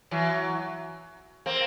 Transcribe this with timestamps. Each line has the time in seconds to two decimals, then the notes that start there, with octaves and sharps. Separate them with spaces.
0.11 E3 F#3
1.46 A#3 C4